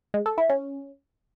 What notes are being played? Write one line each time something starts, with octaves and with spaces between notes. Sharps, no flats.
G#3
A4
E4
C#4